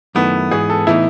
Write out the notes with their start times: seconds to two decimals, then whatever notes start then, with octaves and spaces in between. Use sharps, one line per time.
0.15 F#2 D#3 A3 B3 E4
0.51 G#2 E3 B3 G#4
0.70 A4
0.87 A2 E3 B3 D#4 E4